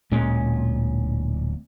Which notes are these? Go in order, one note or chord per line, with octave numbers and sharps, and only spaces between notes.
D1 A#2 G#3 C#4